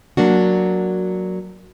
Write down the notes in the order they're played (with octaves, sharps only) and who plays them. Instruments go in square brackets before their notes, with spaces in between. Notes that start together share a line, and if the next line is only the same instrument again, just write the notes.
[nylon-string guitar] F#3 A#3 D4 F#4